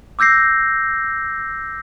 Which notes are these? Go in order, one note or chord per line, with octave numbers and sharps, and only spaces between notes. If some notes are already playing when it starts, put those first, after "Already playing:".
D6 E6 G6 A#6 C7